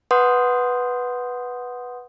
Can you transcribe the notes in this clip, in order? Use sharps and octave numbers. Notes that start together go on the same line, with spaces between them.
B4 F#5 C6 D#6 G6